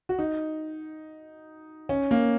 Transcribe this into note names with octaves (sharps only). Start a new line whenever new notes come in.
F#4
D#4
C#4
A#3